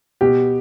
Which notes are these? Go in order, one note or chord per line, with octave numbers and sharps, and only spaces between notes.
B2 G4